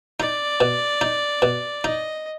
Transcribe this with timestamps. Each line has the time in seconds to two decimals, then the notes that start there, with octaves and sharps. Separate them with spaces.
0.20 D#4 D5
0.61 B2
1.01 D#4
1.42 B2
1.84 D#4 D#5